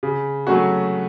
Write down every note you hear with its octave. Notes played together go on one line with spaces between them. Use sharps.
C#3
F#3 A3 C#4 F#4